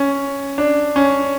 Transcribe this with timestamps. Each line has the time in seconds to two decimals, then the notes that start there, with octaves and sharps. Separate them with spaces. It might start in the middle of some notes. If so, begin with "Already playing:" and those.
Already playing: C#4
0.58 D4
0.96 C#4